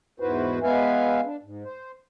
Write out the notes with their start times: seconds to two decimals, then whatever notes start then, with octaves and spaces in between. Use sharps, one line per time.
0.20 E2 G#2 E4 F#4 B4 C5
0.63 G#3 B3 B4 E5 F5 G#5
1.25 D4
1.43 G#2
1.64 C5